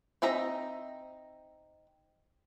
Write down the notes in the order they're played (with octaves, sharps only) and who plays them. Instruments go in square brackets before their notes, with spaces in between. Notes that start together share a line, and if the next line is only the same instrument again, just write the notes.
[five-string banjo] C4 D#4 E5 A#5